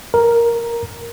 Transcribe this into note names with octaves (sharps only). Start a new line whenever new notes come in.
A#4